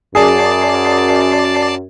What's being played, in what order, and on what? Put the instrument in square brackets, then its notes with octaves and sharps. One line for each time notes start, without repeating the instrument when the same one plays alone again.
[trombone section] F#2 [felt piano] G#4 [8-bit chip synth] D5 A5 C7